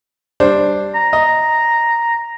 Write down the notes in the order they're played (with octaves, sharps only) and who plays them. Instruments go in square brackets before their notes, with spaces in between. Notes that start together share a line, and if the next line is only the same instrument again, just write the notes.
[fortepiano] G3 D4 C5
[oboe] A#5
[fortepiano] D#5